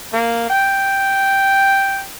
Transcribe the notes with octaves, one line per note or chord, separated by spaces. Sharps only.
A#3
G5